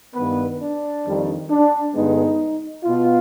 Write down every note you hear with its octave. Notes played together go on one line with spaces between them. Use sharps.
G2 D#3 B3 B4
D4
F2 D#3 G3
D4
G2 D3 G#3 B3 D#4
B2 B3 F4